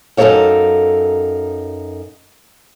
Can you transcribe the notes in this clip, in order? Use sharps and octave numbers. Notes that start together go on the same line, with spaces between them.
F#2 D#4 A4 A#4 C#5 F5